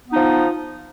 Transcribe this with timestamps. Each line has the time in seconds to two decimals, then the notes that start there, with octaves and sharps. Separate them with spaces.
0.07 B3
0.10 D#4
0.13 F3